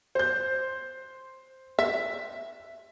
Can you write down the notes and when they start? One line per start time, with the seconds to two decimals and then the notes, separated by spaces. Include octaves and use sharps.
0.15 C5 G6
1.79 E5 B6